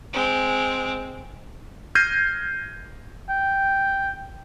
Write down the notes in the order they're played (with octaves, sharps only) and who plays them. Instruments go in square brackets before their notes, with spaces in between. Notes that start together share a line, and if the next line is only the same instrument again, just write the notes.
[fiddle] G#3 C4
[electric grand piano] F6 G6 G#6 A#6 C7 D#7
[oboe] G5